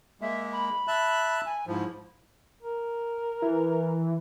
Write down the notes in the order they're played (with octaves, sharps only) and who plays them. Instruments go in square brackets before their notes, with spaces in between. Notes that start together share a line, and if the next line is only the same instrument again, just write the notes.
[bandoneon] G#3 A#3 [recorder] E5
[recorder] B5
[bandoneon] E5 A5 F#6
[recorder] G#5
[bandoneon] G#2 F3 [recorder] E4
[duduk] A#4
[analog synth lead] E3